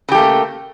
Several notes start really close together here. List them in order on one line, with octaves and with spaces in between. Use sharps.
C#3 G4 A3 A#3